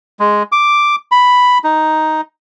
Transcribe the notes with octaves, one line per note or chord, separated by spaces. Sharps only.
G#3
D6
B5
D#4